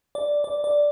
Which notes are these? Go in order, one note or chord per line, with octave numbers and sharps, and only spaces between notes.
D5
D5
D5